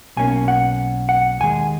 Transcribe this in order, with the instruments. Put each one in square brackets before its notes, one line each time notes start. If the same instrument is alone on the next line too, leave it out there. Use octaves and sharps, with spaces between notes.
[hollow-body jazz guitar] B1 B2 A#3 C#4 G#5
F#5
F#5
D#2 D#3 G#3 G#5